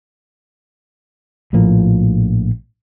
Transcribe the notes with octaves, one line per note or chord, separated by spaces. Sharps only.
A#1 A2 F3 A#3